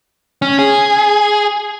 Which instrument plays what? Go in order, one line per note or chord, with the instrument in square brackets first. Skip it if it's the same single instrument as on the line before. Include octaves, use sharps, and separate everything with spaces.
[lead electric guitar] C#4
G#4